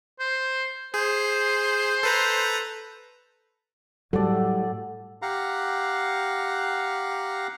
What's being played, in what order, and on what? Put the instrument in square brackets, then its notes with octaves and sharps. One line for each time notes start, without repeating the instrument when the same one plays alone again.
[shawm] C5
[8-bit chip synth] G#4 [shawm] C5
[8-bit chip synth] A4 B4 A#5
[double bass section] A2 [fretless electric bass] F#3 G3 [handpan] A4 [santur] D5 F#5
[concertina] G4 F5 F#5 A#5